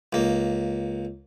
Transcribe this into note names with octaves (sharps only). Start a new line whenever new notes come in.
C#2 A#3